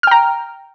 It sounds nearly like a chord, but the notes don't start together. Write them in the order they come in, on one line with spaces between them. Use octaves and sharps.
F6 G5 A#5